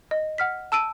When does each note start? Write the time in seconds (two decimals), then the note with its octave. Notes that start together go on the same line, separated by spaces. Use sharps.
0.11 D#5
0.38 F#5 F6 B6
0.72 A5 E6 D7 D#7